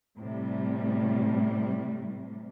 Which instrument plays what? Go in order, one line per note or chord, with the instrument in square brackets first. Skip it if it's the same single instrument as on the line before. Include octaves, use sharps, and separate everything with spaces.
[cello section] A2 C3 G3